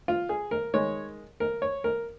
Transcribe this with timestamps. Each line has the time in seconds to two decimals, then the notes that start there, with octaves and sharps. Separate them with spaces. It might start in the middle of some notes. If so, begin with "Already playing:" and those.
0.08 F4
0.29 G#4
0.51 A#4
0.74 D#3 G#3 C#5
1.40 A#4
1.62 C#5
1.84 A#4